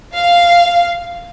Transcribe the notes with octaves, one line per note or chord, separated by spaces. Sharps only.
F5